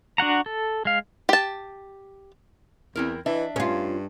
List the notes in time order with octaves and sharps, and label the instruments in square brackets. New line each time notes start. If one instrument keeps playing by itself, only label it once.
[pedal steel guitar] D4 F#4 F#5 A#5
A4
G#3 F5
[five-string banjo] G4 A5
[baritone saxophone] E2 [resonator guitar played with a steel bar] C4 E4 A#4
[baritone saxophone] E3 [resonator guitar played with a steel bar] D4 D#5 E5
[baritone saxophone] G2 [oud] C#4 F4